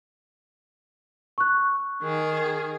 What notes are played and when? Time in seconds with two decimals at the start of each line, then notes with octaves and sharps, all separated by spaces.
1.38 C#6 F#6
2.03 D#3 G#4